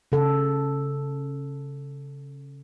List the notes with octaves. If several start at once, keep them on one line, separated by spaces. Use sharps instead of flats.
C#3 A4